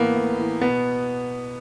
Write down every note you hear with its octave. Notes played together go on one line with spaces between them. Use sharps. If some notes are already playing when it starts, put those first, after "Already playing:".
Already playing: A2 E3 A#3 B3
A2
E3
B2 B3